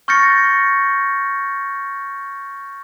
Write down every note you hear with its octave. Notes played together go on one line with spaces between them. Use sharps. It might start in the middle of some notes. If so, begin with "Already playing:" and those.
C#6 F6 G6 A6 A#6 C#7